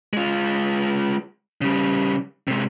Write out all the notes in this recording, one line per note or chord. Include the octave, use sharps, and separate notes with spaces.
G#3 F4
C#3 G3
C3 G#3